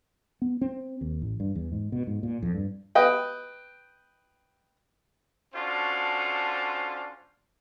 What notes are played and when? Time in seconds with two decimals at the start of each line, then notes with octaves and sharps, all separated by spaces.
0.42 B3
0.61 C4
1.01 D#2
1.22 A1
1.40 G2
1.55 E2
1.72 G#2
1.92 B2
2.07 G#2
2.23 A#2
2.43 F2
2.55 G2
2.95 B4 D#5 G5
5.54 C#4 D4 F4 F#4 A4 C5